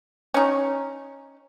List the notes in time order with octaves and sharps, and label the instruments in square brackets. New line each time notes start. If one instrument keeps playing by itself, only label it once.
[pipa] C#4 D#4